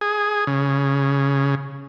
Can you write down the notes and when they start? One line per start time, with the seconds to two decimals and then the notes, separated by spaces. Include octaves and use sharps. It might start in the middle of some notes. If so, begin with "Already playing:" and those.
0.01 G#4
0.47 C#3